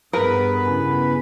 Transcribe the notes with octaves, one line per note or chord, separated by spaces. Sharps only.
G2 B3 G#4 A#4 B4
C#3 C#4 E4